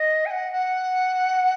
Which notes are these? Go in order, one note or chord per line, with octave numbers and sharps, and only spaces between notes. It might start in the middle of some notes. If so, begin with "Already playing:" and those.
Already playing: D#5
G#5
F#5
F#5